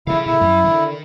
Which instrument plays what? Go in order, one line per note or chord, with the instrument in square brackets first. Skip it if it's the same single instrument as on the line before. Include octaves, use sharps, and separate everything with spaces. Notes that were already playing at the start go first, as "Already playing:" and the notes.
[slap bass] D3 F3 [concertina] E4 [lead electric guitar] G#4 F5
[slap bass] A#2 D3 [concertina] E4
[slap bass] F#2 [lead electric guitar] G3
[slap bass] D3 [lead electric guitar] D#3